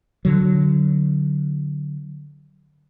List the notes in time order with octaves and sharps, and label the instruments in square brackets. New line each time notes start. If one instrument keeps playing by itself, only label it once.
[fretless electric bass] D3 F#3